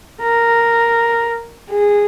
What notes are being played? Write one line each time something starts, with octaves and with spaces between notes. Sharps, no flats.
A#4
G#4